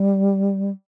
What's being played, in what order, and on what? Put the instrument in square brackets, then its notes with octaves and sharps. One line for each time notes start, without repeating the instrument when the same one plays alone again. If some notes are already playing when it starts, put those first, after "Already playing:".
Already playing: [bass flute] G3